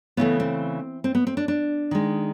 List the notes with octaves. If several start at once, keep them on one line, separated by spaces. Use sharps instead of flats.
C#3 E3 A3 B3
C4
C4
B3
C4
D4
D4
D#3 G#3